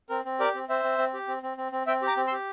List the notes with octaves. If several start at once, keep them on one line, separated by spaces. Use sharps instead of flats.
C4 A#4
C4
G4 A#4 D5
C4
C4 C5 E5
C4
C4
G4
C4
C4
C4
C4
C4 E5 G5
G4
A#5 D6
C4
C6 E6
G4